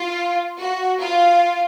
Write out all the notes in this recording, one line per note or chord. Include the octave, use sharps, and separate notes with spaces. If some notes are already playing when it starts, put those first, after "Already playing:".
Already playing: F4
F#4
F4